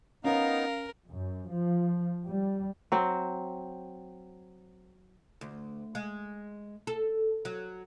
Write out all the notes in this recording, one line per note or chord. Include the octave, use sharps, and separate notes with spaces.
B3 C#4 D#4 A#4 F5
F#2
F3
G3
F#3 C4
D2
G#3
A4
F#3